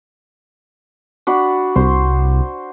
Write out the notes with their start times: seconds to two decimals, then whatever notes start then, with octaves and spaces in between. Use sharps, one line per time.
1.27 D4 F#4 B5
1.76 C2 C5